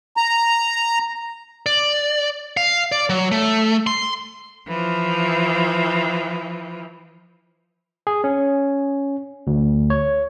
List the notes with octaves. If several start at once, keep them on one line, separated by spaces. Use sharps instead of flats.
A#5
D5
F5
D5
F#3
A3
C6
E3 F3
G#4
C#4
D2
C#5